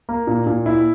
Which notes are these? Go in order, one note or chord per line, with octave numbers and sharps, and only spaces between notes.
A#3
A#2
A#2
E4